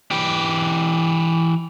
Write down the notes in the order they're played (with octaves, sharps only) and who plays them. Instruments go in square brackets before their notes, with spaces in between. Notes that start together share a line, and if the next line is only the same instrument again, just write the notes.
[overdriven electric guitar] E3 G4